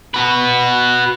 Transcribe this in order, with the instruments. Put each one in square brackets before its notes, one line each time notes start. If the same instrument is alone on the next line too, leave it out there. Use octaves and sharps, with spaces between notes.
[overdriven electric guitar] F#4 B4